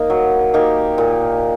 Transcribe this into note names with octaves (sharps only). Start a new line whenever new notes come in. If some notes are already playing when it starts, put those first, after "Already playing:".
Already playing: A#3 D#4
F#3
A#3 D#4 G4
A#2